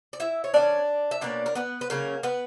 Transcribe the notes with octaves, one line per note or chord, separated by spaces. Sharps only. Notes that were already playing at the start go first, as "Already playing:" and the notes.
D5
E4 E5
C#5
E3 A#3 C#4 D4 D5
E5
B2 A#3 C#4 D4 D5
A#4
B3 B4
B4
C#3 F#3 A#3 C#4 A#4
B3 B4